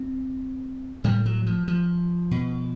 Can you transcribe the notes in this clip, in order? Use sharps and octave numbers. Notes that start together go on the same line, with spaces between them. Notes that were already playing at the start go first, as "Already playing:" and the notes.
Already playing: C4
A2 G3
F#3
F3
F3
B2